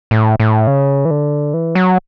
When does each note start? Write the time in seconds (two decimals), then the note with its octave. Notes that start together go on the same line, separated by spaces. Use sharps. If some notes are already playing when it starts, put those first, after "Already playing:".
0.11 A2
0.40 A2
0.67 C#3
1.05 E3
1.11 D3
1.54 E3
1.75 F#3